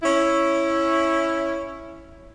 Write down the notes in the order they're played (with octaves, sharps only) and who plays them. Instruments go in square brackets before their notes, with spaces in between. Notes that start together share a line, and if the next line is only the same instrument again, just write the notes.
[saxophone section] C#4 E4